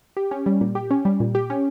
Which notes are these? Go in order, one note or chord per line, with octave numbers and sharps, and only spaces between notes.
G4
C#4
G3
A#2
G4
C#4
G3
A#2
G4
C#4